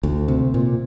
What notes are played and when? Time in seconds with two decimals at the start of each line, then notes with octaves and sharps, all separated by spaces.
0.03 D2
0.28 C3
0.54 A#2